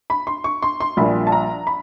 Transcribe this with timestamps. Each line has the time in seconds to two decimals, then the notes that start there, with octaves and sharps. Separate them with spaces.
0.10 B5
0.27 C6
0.44 C#6
0.62 C6
0.80 C6
0.97 A#1 A#2 G3 B5
1.27 A5
1.32 A#5
1.67 B5